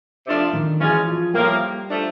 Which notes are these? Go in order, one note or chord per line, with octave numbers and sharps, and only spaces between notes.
C3 F3 A3 D4 F4
D#3 D#4
B2 E3 G#3 C#4 E4 F4 G#4
F3 F4
A2 F3 G3 A#3 G4
F3 A3 D4